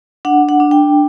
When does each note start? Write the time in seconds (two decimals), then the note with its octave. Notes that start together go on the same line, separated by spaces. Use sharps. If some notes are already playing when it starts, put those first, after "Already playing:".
0.25 D4 F#5
0.49 F#5
0.60 D4
0.71 G5